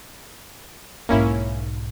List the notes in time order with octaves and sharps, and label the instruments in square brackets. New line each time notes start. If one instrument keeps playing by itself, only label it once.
[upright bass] B1 G#2 [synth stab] A#3 C#4 E4